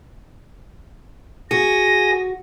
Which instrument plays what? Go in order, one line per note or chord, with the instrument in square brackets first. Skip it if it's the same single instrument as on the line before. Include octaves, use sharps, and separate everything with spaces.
[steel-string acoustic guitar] F#4 [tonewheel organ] G#4 D#6 [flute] A#6